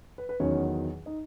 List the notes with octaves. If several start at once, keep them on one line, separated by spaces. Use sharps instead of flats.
B4
B4
E2 D#3 F#3 C#4 C#5
D#4 D#5